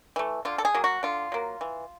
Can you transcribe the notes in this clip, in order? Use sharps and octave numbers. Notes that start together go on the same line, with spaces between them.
E3 A3
D3 F4
A4
G#4
F#3 A#3
F#4
D3 F4
F#3 A#3
E3